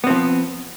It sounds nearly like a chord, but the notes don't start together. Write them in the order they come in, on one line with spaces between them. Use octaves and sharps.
B3 C4 F3